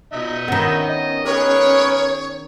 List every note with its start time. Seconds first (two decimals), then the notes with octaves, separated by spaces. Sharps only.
0.13 B2 D#4 D#5 E5
0.48 D#3 B3 C#4
0.89 D#5
1.25 G#4 A#4 B4 C#5